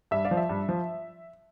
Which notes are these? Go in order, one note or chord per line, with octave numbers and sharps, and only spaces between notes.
G2 E5
D5 F5
F3
E5
G2
F3